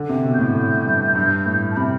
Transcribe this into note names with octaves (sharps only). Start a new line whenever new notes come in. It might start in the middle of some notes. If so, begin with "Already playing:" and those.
Already playing: D3
C3
B2
A2 G6
A2
G2
G2
A2
A5
C3 B5